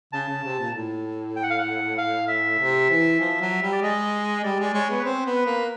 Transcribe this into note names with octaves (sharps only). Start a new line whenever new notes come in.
C#3 A5
C#3
C3
A#2
A2
G5
F#5
F5
F#5
F5
E5
C3
E3
F3
F#3
G3
D5
G#3 D#5
G3 D5
G#3
D5
G#3 C#5
B3
B4
C4 C5
B3
B4
A#3